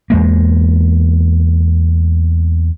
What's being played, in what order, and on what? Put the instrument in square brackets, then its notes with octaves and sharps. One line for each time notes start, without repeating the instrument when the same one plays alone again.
[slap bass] E2 G#3 A#3